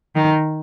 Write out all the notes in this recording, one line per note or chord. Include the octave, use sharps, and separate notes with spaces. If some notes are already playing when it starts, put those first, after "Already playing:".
D#3